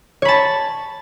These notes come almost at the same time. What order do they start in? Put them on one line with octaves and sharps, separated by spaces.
C#5 B5 A5